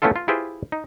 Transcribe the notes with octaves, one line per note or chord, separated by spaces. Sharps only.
A3 B3 C#4 E4 F4 A4
F4
E4 F4 G4 G#4 B4 C5
D#4